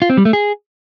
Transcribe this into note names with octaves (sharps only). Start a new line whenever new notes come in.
F4
C4
G3
A3
G#4